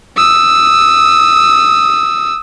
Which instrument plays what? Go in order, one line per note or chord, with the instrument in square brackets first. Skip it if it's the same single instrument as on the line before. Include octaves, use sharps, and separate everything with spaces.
[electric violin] D#6 E6